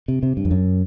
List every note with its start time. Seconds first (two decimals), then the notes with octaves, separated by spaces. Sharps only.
0.08 C3
0.23 C3
0.37 G2
0.45 F2
0.51 F#2